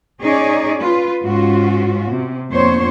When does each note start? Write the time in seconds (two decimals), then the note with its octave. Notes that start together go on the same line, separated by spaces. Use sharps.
0.21 C#4 D#4 G#4 C#5 D5
0.79 F4 B4
1.24 G#2 C#4 F4 F#4
2.11 C3
2.50 F2 A#2 B3 D4 C5 C#5